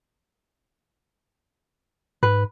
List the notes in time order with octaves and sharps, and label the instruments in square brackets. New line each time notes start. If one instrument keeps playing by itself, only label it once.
[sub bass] G#2 [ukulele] B4